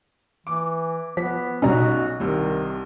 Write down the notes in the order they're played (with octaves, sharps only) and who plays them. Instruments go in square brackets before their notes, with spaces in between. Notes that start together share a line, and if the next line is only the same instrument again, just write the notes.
[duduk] E3 [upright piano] D6
[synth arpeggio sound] F3 [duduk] B3 [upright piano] B6
[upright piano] B1 D#4 A#5 [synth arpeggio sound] B2 G3 C#4 [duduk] F#4
[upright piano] C2 C3 [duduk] D#3